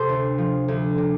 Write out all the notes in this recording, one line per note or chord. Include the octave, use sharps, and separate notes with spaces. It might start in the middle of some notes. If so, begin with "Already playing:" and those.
Already playing: C3 G4 A4 C5
D2
F3
D2
C3